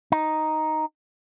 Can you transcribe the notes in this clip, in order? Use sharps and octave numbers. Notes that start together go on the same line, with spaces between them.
D#4